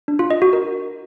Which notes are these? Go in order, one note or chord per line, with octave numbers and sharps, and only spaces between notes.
D4
F4
D#5
F#4
A#4